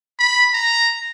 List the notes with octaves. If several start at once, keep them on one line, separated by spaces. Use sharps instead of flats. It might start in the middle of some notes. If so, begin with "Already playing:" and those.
B5
A#5